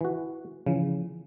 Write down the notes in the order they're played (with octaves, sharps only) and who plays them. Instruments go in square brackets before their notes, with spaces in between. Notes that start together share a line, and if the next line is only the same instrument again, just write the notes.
[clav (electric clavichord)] E3 F#4
[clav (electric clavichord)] C#3 [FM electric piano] E3 F3